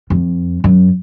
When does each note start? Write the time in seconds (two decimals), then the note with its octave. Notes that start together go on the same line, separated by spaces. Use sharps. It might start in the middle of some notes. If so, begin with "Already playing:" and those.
0.10 F2
0.64 F#2